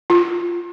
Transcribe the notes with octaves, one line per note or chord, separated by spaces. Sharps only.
F4